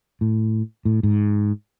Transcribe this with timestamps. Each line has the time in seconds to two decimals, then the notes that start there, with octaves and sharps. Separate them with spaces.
0.21 A2
0.85 A2
1.03 G#2